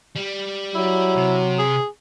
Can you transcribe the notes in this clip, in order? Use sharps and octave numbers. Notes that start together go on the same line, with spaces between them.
G3
F#3 E4
C3
G#4